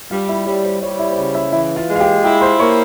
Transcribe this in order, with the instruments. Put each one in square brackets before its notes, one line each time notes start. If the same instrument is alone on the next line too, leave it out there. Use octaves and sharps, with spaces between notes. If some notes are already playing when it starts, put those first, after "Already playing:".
[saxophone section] G3 [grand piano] F4 F5
[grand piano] E4 E5
[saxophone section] G3 [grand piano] C#5
[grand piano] C5
[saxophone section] G3 [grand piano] C#5
[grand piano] E4 E5
C5
[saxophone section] C#3 [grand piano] C#5
[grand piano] E4 E5
[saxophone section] E3 [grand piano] E4 E5
[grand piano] F4 F5
[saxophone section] G#3
[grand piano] F5
G4 G5
[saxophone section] E4 [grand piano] G4 G5
[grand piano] C5 C6
[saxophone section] A#3 [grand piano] C#5 C#6